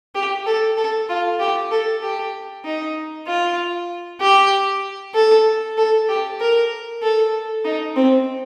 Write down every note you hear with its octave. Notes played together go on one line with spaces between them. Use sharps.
G4
A4
A4
F4
G4
A4
G4
D#4
F4
G4
A4
A4
G4
A#4
A4
D#4
C4